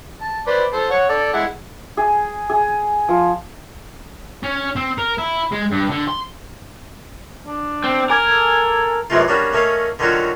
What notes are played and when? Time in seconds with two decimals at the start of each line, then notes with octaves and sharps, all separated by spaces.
0.21 A5
0.47 B4 C5 D5
0.73 A4 C5
0.90 C#5 F#5
1.09 A4 D5
1.33 G#3 E4 F#5
1.97 G#4
2.50 G#4
3.09 F3
4.43 C#4
4.76 C4
4.98 A#4
5.18 E4
5.51 G#3
5.71 G2
5.90 D3
6.08 C6
7.47 D4
7.84 C4
8.10 A#4 G#5 D6 G#6
8.29 A4
9.10 F#2 C3 E3 G#3 A3 F4
9.28 G3 A#3 C#4 D4 F#4
9.53 A3 A#3 C#4 C#5 D#5 F5
9.99 D3 D#3 F#3 C#4 F4 F#4